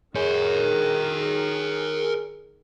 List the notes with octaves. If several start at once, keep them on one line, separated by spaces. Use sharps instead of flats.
D#3 G#4 A#4 C#5